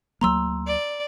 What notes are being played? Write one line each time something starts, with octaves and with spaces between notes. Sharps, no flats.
D2 F#3 A#3 A#5 C6 E6
D5